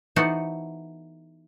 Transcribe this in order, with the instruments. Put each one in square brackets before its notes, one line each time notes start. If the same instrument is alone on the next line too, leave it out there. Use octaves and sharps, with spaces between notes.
[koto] E3 B3 D#4 F#4 A4 C5